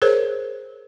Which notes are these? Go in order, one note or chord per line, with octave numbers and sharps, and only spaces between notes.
G#4 A#4 C5 C#5